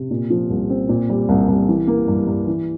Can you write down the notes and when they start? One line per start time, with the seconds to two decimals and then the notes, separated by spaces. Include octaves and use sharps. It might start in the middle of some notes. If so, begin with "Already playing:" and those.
Already playing: C3
0.11 A#2
0.30 F3
0.50 C2
0.70 C4
0.89 A#2
1.09 G3
1.29 C2
1.48 C2
1.68 E3
1.87 A#3
2.08 G2
2.27 G2
2.47 E3